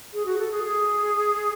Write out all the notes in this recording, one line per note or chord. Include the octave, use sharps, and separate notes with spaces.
G#4
F#4
A4
G#4
G#4